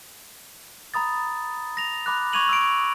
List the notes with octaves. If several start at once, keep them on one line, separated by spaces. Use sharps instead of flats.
A#5 B5 D#6 A6
A#6 F7
B5 D6 F#6
C#6 D6 G#6 D#7 F7 F#7
E6 D7